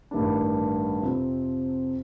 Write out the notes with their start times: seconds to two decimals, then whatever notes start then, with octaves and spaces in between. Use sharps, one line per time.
0.11 A1 G2 D#3 G3 D4
1.02 F2 C3 F3 C4